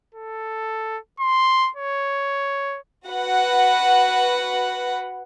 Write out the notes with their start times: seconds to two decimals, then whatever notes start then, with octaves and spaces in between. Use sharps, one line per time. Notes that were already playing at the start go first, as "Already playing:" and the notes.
0.15 A4
1.20 C6
1.76 C#5
3.08 F#4 B4 F#5